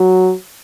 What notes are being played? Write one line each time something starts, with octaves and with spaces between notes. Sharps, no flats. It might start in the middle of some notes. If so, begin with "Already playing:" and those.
Already playing: F#3